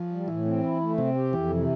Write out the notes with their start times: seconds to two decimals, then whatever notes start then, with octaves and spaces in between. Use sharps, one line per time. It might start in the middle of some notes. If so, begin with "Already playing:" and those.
Already playing: F3
0.11 G3
0.28 A2 E3
0.45 C4
0.64 E4
0.81 A3
0.97 C3 C4
1.15 G4
1.32 F2 E3
1.50 C3